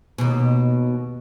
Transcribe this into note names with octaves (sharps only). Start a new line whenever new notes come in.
D#2 B2